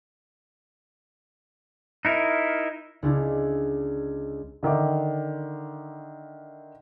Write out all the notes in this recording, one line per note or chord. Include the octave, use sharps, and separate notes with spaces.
D#4 E4 A#4
C#2 D4 E4
D3 D#3 E5 D6